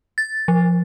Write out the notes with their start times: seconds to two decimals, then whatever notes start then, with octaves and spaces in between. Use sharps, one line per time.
0.18 A6
0.48 F3